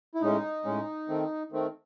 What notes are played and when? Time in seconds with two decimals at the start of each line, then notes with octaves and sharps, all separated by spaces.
0.15 E4
0.21 A2 G#3 C#4 D#4
0.65 A2 G#3 C#4
1.08 D#3 A3 C4
1.52 D#3 A3 C4